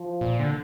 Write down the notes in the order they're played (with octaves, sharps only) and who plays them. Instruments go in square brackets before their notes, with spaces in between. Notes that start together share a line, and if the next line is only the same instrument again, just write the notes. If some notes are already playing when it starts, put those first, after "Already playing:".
Already playing: [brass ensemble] F3
[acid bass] A#2
D3